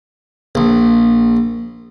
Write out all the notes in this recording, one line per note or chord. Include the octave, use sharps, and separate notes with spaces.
A#1